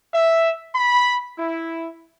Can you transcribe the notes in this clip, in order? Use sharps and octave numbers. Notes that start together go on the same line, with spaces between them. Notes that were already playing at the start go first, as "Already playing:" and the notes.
E5
B5
E4